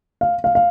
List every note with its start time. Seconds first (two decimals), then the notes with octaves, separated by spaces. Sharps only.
0.21 F5
0.44 F5
0.55 F5